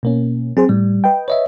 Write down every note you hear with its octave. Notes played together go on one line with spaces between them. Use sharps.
B2 A#3 C#4
F#3 C4 G#4 C5
A2 G3
B4 D#5 G5
B4 C#5 D#5 E5